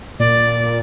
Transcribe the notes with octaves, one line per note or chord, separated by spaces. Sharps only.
A#2 D5